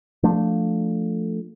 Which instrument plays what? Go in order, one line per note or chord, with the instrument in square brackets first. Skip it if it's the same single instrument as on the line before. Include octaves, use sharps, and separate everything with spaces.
[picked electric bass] F3 A3 D4